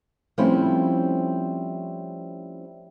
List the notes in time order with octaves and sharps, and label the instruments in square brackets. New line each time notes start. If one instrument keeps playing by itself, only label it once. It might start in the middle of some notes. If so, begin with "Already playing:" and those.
[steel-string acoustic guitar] F3 G3 A3 C4 C#4 E4